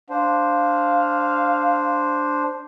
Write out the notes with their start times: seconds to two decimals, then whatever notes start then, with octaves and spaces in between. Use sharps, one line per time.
0.10 D4 C5 F5